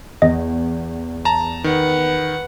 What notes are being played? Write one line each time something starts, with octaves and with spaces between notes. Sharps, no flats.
E2 D#5
A5 A#5
D#3 B4 F#5